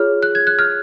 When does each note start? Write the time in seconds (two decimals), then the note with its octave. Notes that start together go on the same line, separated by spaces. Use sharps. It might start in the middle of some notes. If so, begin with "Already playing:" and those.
Already playing: F4 G#4 C#5 F6
0.23 F#6
0.35 G#6
0.47 F#6
0.59 F6